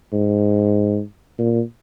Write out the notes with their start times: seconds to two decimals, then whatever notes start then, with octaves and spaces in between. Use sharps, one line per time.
0.12 G#2
1.39 A#2